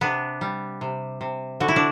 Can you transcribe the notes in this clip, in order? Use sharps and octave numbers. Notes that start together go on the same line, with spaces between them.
C3 B3 D4
G3
C3
C3
D3 F#4
E4
D4